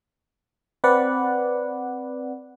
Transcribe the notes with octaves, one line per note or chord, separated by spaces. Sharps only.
C4 B4 D5 F#5